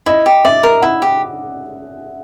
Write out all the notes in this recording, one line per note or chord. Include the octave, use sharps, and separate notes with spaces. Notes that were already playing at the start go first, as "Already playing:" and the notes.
E4 D#5
G4
D5 E5
A#4
E4 F#5
G4